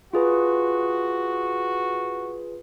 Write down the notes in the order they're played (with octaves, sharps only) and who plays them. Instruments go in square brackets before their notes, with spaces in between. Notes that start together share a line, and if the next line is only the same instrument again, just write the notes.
[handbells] F4 G#4 B4 [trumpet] F#4